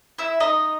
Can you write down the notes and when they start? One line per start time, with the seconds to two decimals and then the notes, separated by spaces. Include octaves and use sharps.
0.18 E4 E5
0.40 D#4 D#5